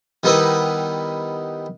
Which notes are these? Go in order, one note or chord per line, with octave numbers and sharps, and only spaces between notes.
D#3 G3 B3 D#4 E4 B4